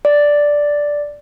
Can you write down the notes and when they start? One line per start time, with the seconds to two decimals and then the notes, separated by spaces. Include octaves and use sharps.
0.05 D5